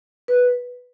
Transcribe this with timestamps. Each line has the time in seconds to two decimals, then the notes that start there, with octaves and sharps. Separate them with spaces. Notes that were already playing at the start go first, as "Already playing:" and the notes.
0.28 B4